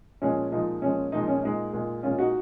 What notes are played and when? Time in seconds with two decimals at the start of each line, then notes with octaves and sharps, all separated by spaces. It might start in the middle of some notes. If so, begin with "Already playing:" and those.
0.22 A#2 F3 G#3 C#4
0.52 A#2 F3 G#3 D#4
0.82 A#2 F3 G#3 C#4
1.12 A#2 F3 G#3 D#4
1.28 C#4
1.43 A#2 G#3 D#4
1.73 A#2 G#3
2.03 A#2 G#3 C#4 F4
2.18 D#4 F#4